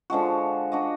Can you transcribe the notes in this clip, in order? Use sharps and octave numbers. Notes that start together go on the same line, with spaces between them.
D3 F3 G#3 F#4
D4 F#4 D#5